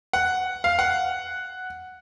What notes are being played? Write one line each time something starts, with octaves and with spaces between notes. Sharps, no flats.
F#5
F5
F#5